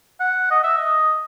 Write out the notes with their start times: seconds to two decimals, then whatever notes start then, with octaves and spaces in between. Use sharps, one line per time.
0.20 F#5
0.51 D#5
0.64 E5
0.78 D#5